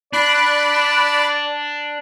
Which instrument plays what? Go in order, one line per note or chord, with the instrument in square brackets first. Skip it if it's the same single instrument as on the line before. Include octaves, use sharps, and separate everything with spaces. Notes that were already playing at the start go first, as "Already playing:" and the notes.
[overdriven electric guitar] D4 [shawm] D5 [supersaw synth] B5 F#6